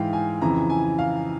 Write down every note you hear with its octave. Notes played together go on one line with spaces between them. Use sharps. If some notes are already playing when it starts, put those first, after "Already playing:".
Already playing: G#2 E3 F5 G5
G#5
F2 C#3 E3 A#5
G#5
F5